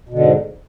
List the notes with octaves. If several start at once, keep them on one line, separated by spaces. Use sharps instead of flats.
G#2 B2 D3